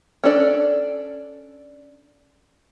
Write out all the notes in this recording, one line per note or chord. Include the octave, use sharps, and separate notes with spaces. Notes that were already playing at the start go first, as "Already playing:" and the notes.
C#4 D4 A4 D5